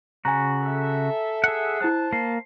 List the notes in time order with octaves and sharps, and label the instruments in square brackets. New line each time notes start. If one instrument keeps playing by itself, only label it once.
[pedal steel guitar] C#3 F#4 [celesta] G#5 A#5
[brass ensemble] A4 E5
[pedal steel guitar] G#4 F#5
[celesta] E4 F#6 [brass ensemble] C5 A5
[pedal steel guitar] A#3 [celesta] C7